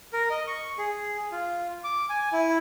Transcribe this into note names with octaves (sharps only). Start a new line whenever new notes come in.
A#4
D#5
C#6
G#4
F4
D6
G#5
E4